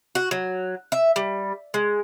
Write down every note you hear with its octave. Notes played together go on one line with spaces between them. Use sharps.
F#4
F#3
E5
G3
G#3